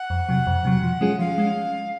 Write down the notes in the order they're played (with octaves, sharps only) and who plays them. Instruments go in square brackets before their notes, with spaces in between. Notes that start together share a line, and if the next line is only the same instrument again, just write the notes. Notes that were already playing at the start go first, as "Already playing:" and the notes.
Already playing: [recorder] F#5
[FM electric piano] F2
C3 F#3
F2
C3 F#3
F3
G#3 C#4 F4 G#4
[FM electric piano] F3 [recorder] F5
[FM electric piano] G#3 C#4